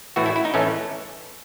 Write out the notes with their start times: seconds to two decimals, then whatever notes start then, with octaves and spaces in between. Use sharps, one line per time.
0.16 A2 E3 A3 F#4
0.26 E4
0.36 E4
0.45 D#4
0.54 A2 E3 A3 C#4